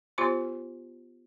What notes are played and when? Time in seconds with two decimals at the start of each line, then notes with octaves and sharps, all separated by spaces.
0.18 B3 F4 G4 C5 C6